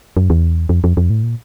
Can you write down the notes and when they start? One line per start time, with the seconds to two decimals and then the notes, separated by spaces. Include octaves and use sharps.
0.17 F#2
0.30 E2
0.69 F2
0.84 F2
0.97 F2
1.10 A2
1.23 A#2